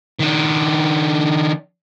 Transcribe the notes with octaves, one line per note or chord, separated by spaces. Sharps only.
D#3 D4